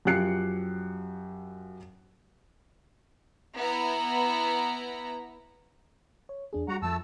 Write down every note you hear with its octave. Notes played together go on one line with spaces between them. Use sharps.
F#2 F3 G4 F#6 C7 C#7
B3 E4 A#5
C#5
E2 D4 G#4
G3 F#4 F#5 A#5
F2 F3 A3 A5 E6